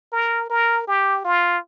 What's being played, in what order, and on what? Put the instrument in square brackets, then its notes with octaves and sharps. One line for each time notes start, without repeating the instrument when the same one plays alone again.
[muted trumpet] A#4
A#4
G4
F4